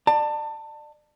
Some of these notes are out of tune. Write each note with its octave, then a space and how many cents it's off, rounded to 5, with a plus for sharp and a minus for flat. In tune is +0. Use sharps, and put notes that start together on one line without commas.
D5 +30 A5 +25